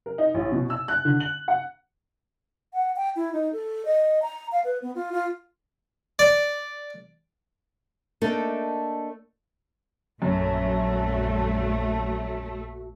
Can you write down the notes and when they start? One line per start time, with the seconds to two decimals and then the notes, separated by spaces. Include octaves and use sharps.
0.06 A#4
0.18 D#4
0.34 A1
0.52 B2
0.70 E6
0.88 F#6
1.05 D3
1.20 F#7
1.48 F#5
2.73 F#5
2.96 G5
3.16 E4
3.33 D#4
3.53 A4
3.85 D#5
4.22 A#5
4.52 F5
4.64 B4
4.82 B3
4.95 F4
5.13 F4
6.19 D5
8.21 A3 A#3 D4 D#4 A4
10.22 A#1 F#2 A3 F#4